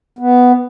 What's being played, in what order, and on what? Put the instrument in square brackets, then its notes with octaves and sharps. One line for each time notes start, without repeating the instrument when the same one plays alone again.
[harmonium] B3